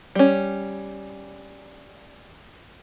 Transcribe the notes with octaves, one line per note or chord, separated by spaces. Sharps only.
G3 C#4